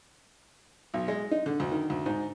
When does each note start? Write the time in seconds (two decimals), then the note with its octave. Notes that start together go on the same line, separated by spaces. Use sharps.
0.94 B1
1.08 G#3
1.31 D#4
1.46 D3
1.60 D2
1.72 D#3
1.90 D2
2.06 G#2